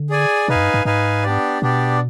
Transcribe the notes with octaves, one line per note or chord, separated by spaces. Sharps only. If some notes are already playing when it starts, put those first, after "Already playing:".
Already playing: D3
G#4 D5 G#5
B2 D#4 B4 F5 G#5
F2
G2
G#2
G#2 D#4 B4 F5 G#5
B3 D4 G4 D5
B2 B3 D4 G4 D5